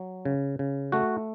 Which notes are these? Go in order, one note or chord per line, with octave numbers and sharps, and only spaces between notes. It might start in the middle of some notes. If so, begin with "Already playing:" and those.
Already playing: F#3
C#3
C#3
A3 F#4